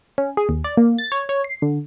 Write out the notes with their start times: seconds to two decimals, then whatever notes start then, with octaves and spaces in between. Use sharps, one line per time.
0.18 C#4
0.37 G#4
0.49 D#2
0.64 D5
0.77 A#3
0.98 A6
1.12 C#5
1.29 C#5
1.44 C7
1.62 D3